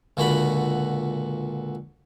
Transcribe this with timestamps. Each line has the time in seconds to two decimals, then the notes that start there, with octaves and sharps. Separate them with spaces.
0.17 C#2 A#2 D3 F#4 F#5 B5